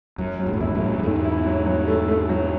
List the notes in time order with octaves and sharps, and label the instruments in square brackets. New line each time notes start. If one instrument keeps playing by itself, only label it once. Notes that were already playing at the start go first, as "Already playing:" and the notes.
[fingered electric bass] F#2 [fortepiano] F#3
[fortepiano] F#3
[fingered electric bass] G#2
A2
[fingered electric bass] E2 G#2 [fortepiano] E4
[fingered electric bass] F#2 A2
[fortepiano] F#3
[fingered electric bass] A2
[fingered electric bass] E2 G#2 [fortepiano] A3
[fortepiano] E4
F#3
F#3
A3
A3
F#3